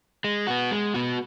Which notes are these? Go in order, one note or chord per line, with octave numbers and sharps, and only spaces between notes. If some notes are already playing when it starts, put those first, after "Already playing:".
G#3
B3 F#4
G#3
B3 F#4